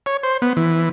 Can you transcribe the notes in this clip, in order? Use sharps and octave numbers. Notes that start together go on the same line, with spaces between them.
C#5
C5
B3
E3